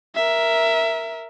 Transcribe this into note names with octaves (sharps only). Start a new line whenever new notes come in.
A#4 E5